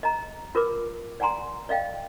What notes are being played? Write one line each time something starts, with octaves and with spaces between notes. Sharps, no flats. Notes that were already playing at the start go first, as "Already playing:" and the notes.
D#5 A#5
F4 A#4 B4 D6
D5 F#5 G#5 A#5 C6
D5 D#5 F5 G5